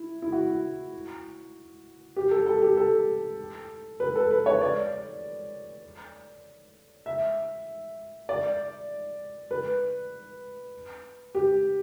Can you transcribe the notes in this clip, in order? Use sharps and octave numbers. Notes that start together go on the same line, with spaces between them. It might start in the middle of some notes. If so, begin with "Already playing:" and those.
Already playing: E4
E4
F#4
G4
A4
A4
G4
A4
B4
A4
B4
C#5
D5
E5
D5
B4
G4